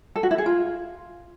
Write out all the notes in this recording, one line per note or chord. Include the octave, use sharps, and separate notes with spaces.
A4
F#4
E4
G#4
F4